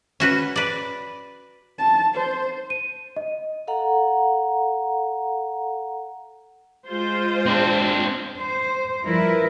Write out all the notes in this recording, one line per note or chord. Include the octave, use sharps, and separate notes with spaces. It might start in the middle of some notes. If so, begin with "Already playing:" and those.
C#4 F#4 B4
B4 D5
A5
C5
D#7
D#5
A4 F5 F#5 A#5
G#3 F4 C5
C4 D4
C5
F3 G3 E4 A#4 B4